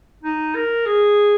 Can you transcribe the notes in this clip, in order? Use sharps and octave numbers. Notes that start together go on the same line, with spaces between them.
D#4
A#4
G#4